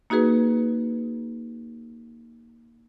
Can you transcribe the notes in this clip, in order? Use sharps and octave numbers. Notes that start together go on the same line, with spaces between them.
A#3 D#4 F#4 G#4 B4